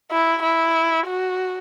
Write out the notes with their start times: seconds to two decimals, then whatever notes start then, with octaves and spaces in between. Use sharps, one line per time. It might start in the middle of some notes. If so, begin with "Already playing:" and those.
0.12 E4
0.43 E4
1.07 F#4